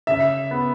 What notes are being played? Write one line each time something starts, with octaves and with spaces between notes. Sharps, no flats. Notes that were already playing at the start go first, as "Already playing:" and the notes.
C#3 E5
B3